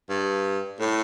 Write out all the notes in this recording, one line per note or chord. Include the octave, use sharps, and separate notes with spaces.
G2
A2